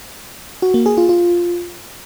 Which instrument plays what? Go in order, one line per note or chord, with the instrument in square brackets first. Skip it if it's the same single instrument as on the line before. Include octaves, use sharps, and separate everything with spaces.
[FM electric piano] F#4
A#3
G#4
F4
F4